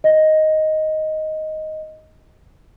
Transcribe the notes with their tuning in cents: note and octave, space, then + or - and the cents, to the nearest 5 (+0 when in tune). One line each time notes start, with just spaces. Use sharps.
D#5 +5